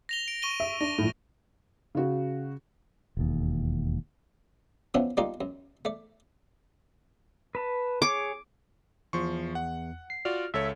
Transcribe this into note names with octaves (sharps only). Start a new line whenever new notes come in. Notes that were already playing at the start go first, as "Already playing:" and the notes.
A#6 F7 G7
D7
C#6 D#7 G7
E5
D4 A#6
A#1 A2
C#3 F#4
E1 D#2
F3 B3 C#4 D4 E4
G3 A#3 D4 D#4 F4 D5
F#2
A3 D5
B4 A5
G#4 C#5 D6
E2 F3 C6 C#6
F#5
C7
F4 F#4 D5 F6
C#2 A4 C#5 E5